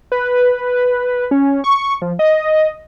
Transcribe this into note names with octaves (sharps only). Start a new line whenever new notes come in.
B4
C#4
C#6
F3
D#5